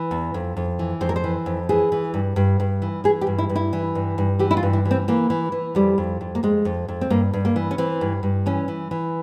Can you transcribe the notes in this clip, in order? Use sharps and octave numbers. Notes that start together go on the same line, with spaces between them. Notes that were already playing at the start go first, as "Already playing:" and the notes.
Already playing: E3
E2
F2
F2
E3
F2 C5
A#4
C5
E3
F2
E3 G#4
E3
G2
G2
G2
E3
E3 G#4
G4
G2
E4
G2
E4
E3
G2
G2
E3 G4
E4
F4
G2
E4
E3
C4
E3 A#3
E3
E3
F2 G3
F2
F2
A#3
F2 G#3
F2
F2
C4
G2 A#3
G2
A#3
E3
C#4
E3 C4
G2
G2
E3 C#4
E3
E3